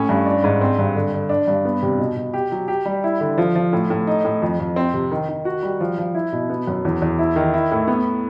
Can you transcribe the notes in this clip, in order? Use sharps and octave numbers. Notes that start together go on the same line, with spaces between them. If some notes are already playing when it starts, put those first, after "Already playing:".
Already playing: A2 C#4
G2
D4
G#2
C4
G2
D3
D3
D4
G2
B3
C3
B2
B2
G4
F#3
G4
G3
E4
D3
F3
F3
A2
A2
D#4
A2
F2
F2
C4
C3
D#3
D#3
F#4
G3
F3
F3
E4
B2
B3
F#2
E2
E2
E4
D#3
E4
A2
B3